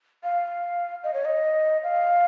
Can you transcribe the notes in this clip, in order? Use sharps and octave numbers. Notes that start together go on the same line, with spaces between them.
F5
D#5
C#5
D#5
F5